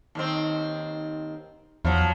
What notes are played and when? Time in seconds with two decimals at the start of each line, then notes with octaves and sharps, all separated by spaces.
0.15 D#2 D#3 C4
1.85 E2 F3 F#3